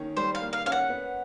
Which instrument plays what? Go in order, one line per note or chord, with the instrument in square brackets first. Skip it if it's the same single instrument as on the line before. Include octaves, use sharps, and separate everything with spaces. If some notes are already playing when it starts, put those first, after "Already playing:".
Already playing: [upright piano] D#3 A#3 C#4
[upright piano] G3 [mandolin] C5
[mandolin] F5
[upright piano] A#3
[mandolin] F5
[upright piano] C#4 [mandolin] F5
[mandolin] F#5
[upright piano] B3